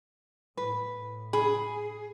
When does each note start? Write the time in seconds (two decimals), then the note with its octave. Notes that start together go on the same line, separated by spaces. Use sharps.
0.57 A2 B4
1.33 G#4 B5